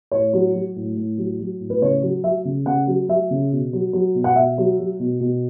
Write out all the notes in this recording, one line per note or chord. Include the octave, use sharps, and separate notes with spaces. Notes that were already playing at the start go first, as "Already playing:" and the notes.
A2 C#5
F#3
F#3
A2
A2
F#3
F#3
A2
B4
C#3 C#5
F#3
F#3 E5
C#3
C#3 F#5
F#3
F#3 E5
C#3
B2
F#3
F#3
B2
F#5
B2 E5
F#3
F#3
B2
B2